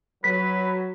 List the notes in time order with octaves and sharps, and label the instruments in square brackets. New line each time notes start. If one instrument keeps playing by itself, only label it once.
[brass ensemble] F#3 [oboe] B4 [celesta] B6